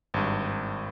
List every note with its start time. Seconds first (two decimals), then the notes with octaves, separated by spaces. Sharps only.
0.14 G#1 G2